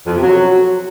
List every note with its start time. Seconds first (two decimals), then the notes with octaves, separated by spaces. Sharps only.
0.06 F2
0.14 C3
0.23 F#3